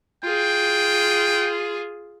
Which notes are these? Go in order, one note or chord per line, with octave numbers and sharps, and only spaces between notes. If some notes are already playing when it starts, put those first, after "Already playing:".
F4 G#4 G5